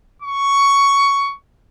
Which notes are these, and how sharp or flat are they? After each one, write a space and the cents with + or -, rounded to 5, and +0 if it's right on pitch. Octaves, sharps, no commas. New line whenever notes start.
C#6 +10